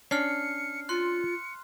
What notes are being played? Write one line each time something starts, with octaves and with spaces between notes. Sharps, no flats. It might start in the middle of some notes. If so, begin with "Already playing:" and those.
C#4 D4 F6 C7 C#7
F4 C6 F#6 C#7